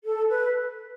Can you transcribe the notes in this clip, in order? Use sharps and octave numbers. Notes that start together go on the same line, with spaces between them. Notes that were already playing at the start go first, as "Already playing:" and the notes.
A4
B4